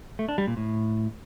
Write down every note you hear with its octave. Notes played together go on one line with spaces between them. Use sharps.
A3
D4
G3
A#2
A2